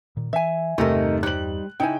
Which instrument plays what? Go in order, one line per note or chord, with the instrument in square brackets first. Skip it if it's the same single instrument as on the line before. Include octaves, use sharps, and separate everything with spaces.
[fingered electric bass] A#2 D#3
[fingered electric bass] E3 [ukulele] E5 G#5
[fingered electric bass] E2 G2 [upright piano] C3 A3 A#4 [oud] D#3 D#4
[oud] G3 C5 [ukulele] D#4 [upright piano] F#6 F#7
[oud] C#3 [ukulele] D#4 E4 G#5 [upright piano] G5